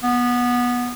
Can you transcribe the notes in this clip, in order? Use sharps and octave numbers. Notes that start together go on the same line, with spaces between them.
B3